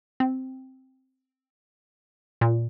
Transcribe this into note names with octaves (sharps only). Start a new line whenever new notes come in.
C4
A#2